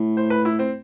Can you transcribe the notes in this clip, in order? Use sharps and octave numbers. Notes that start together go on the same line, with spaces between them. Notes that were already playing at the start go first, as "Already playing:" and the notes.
Already playing: A2
C5
B4
E4
C4